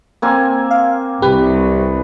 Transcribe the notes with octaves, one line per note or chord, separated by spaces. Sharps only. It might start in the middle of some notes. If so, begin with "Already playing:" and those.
A#3 C4 G#5
F5
C2 G4 B4